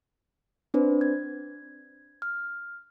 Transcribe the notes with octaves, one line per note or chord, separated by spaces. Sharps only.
C4 D4 B4 C5
G#6
F6